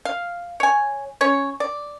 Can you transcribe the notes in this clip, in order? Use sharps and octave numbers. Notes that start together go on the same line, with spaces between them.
F5
C#5 G#5
C#4 C#5
D5